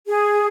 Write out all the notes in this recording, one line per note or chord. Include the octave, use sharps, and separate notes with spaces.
G#4